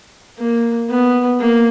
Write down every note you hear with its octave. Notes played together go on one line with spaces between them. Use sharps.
A#3
B3
A#3